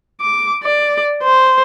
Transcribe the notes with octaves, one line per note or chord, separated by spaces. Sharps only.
D6
D5
C5